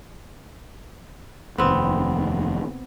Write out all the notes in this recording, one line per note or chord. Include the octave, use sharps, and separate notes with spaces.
F1 D#2 B3 C4